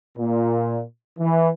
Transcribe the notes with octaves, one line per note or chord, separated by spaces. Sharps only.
A#2
E3